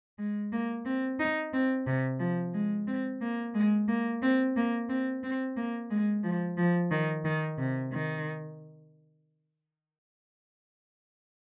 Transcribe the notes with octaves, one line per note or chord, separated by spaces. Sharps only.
G#3
A#3
C4
D#4
C4
C3
F3
G#3
C4
A#3
G#3
A#3
C4
A#3
C4
C4
A#3
G#3
F3
F3
D#3
D#3
C3
D#3